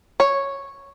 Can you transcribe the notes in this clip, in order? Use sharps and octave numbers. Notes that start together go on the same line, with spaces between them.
C#5